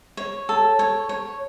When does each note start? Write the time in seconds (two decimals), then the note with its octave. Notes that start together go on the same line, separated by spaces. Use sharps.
0.17 C#5
0.49 A4
0.79 C#5
1.09 C#5